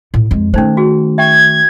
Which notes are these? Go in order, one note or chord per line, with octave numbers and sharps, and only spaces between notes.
A2
F2 G#3
D#3 A3 C#4 D#4 C5
F#4 G#4
E5 G5 C#6 G#6